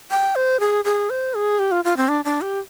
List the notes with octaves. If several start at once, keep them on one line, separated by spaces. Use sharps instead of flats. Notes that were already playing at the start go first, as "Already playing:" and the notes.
G5
C5
G#4
G#4
C5
G#4
G4
F4
F4
C4
D4
D4
G4